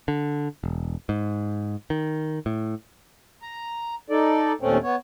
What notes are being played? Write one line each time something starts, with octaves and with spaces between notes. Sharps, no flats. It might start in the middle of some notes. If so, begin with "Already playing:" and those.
D3
E1
G#2
D#3
A2
A#5
D#4 A4 D5
D#2 A#2 A3 C4 C#4
B3 C#5